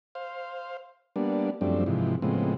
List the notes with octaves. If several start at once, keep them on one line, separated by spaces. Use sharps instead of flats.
C5 F5
G3 A#3 B3 D4
F#2 F3 G3 A3 C4 D4
G#2 C3 E3 F3
A2 C#3 F3 G#3 B3 C4